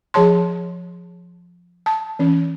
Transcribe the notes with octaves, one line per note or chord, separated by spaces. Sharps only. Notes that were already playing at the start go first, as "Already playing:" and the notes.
F3 G#4 C#5 A5 C6
A5
E3 C#4